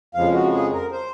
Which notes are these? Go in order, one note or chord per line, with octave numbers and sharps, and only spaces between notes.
F2 C#3 F3 G#3 F5
F#4
G#4
A#4
C5